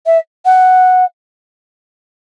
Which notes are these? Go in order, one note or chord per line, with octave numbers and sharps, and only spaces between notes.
E5
F#5